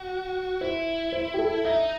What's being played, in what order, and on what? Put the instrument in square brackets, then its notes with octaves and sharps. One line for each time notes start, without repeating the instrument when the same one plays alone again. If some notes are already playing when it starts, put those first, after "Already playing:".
Already playing: [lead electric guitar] F#4
[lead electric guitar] E4 [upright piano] C5
[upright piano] C5
G4
A4
[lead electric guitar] D#4 [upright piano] E5